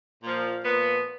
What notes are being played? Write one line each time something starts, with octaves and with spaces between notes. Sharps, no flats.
A#2 F3
A#2 F3 B3